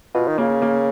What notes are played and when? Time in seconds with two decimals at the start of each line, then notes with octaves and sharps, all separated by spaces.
0.15 B2 F4
0.28 D#3
0.38 C#3 A#3
0.62 A#3